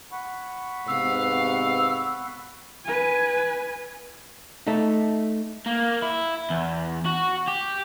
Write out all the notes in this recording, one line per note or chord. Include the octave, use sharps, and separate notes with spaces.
F#5 B5 C#6
G#2 C3 B3 F5 E6
B4 G#5
A3 D#4
A#3
E4
E2
F#4
G4